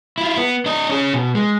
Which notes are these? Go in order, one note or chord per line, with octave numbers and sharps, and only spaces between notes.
E4 F4
B3
D4 D#5
C#4 G#4
B2
G#3